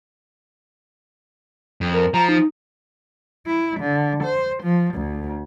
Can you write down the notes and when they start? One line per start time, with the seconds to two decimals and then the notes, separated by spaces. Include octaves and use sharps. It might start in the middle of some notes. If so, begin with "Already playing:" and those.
1.81 F2
1.94 A#4
2.14 F3 A#5
2.29 D#4
3.46 E4
3.80 D3
4.23 C5
4.63 F3
4.94 D2